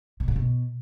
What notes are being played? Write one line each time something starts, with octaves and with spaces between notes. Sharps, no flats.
B2
A#2
B2